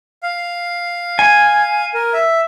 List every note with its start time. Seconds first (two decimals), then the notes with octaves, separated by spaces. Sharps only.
0.23 F5
1.19 G#5
1.94 A#4
2.13 E5